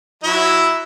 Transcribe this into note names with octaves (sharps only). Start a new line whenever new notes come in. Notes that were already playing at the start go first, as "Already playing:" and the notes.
F#3 E4 E5